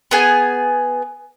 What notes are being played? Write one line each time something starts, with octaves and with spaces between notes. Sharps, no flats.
B3 G#4 G#5